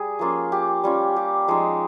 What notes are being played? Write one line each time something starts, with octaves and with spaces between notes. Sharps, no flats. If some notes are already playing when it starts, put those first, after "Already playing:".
Already playing: G3 G#4
F3 A#3 C#4 F4
G4
G3 C#4 F4
G4
F3 G#3 D#4